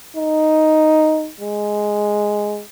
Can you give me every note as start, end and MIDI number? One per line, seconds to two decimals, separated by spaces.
0.17 1.29 63
1.41 2.62 56